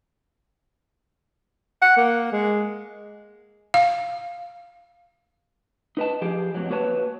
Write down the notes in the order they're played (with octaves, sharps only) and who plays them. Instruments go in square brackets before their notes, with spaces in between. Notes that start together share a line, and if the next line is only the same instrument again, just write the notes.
[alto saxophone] F#5
A#3
G#3
[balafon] F5
[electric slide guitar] D#4 B4 D#5 A5
F3 G4 G#4
F2 G#2 F#3
A#3 F#4 B4 C#5 A5